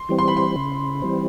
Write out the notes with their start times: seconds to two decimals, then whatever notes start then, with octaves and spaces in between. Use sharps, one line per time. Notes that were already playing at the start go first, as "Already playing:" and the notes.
Already playing: C6
0.09 E3 G3 C4
0.19 C6
0.28 B5
0.37 C6
0.56 C#3
1.02 E3 G3 C4